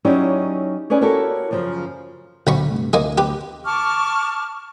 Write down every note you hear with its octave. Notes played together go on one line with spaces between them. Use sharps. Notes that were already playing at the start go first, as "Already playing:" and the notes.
F#3 C#4 D#4 E4 G4 D5
C#4 G#4 B4 D5 G#5
E4 F#4 G4 A4 A#4 C#5
F#2 C#3 F3
D1 B1 D3 B5 C#6
G2 C3 A3
D2 A#3 D#4 G#4
G4 B4
A5 C#6 D6 F6